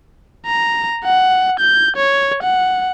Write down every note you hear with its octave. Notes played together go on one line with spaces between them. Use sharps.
A#5
F#5
G6
C#5
F#5